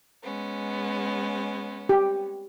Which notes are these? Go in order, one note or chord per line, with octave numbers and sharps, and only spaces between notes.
G#3 B3 C#4
G4